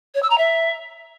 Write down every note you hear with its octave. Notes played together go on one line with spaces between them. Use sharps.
C#5
E6
A#5
E5